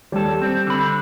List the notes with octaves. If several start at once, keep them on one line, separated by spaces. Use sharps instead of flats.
D#2 G3 A4
C4
D3 B5